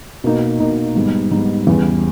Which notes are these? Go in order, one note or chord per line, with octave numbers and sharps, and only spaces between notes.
B2 A#3 D#4
B2 A#3 D#4
G#2 G3 B3 D#4
G#2 G3 B3 D#4
E2 C#3 G3 B3